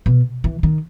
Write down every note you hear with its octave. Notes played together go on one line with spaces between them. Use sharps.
B2
E3
D#3